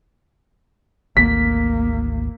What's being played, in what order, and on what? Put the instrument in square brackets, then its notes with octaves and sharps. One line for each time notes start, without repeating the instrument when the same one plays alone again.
[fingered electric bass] G#1 D2 [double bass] A#3 [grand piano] B6